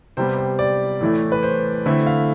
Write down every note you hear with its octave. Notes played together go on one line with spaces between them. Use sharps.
C3 G3 B3 C5
C5
D5
A2 E3 A3
B4
C5
D3 A3 C4 E4
F5